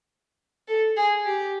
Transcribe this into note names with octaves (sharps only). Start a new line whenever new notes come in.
A4
G#4
G4